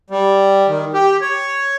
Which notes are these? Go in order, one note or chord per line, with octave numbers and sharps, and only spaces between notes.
G3
D#3
G4
C#5